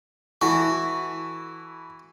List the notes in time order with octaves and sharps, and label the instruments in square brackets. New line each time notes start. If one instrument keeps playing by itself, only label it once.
[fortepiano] E3 E4 A4 [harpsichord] F#4